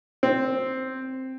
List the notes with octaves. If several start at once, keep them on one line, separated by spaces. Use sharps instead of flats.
C4